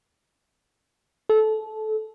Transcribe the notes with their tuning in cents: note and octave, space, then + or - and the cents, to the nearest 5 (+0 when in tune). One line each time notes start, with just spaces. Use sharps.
A4 -20